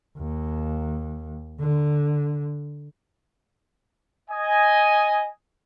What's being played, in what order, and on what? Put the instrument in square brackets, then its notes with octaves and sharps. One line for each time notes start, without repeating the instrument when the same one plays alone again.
[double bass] D#2
D3
[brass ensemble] D#5 G#5